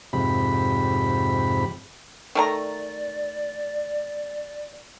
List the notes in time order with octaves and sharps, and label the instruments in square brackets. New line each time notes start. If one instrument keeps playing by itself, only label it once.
[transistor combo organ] F2 G#2 C3 G4 B5
[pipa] D#3 A3 A#5 [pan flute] D5